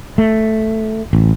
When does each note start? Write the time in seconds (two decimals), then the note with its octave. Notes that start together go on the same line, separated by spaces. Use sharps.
0.18 A3
1.13 A1